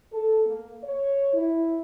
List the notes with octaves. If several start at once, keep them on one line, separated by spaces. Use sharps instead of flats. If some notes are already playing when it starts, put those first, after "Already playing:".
A4
A#3
C#5
E4